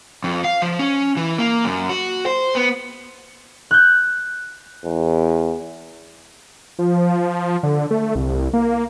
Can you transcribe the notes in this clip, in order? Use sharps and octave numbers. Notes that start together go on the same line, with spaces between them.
F2
F5
F3
C#4
E3
A#3
F#2
F#4
C5
B3
F#6 G6
E2
F3
D3
A3
C2
A#3